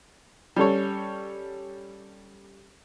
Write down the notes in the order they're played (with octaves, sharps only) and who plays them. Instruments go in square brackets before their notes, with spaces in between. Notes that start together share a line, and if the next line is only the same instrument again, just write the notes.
[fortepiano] G3 C#4 A4 C#5